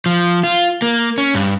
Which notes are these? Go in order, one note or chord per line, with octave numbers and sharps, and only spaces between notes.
F3
F4
A#3
C#4
G2